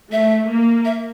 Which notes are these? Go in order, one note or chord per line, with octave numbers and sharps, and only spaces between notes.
A3 E5
A#3
E5